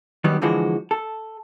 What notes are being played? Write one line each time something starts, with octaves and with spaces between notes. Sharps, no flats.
D#3 F#3 G3 B3
D3 E3 F3 G#3 F#4
A4